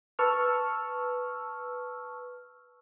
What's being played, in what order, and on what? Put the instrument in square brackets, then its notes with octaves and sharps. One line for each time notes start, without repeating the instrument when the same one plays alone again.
[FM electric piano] B4 A5 C#6 E6 F6